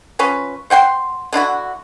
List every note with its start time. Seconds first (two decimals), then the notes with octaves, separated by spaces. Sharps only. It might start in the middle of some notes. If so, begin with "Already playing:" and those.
0.19 F3 C#4 B4
0.70 C5 F#5 G5 C6
1.33 D3 D4 E4 F#4